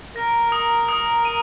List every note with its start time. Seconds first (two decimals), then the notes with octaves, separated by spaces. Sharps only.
0.16 A#4 A#6
0.52 D#6
0.89 D#6
1.25 D#7